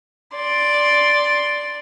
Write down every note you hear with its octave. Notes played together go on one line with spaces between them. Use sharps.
D5 C6